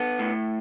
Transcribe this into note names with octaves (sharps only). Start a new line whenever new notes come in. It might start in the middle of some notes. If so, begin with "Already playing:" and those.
Already playing: B3 A4
A2